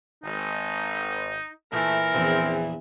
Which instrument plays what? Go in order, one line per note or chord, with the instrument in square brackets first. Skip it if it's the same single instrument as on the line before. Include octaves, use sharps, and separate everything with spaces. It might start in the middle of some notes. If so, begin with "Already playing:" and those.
[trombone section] G#1 [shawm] D#4
[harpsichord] A#2 [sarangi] E3 [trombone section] A3 [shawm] A#4
[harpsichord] A#1 E2 [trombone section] C4